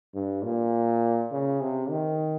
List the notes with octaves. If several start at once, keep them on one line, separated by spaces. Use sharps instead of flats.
G2
A#2
C#3
C3
D#3